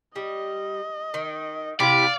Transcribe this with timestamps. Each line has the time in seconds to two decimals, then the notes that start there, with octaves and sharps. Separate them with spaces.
0.16 G3 D#5
1.14 D#3
1.80 C3 E4 G4 D5 F5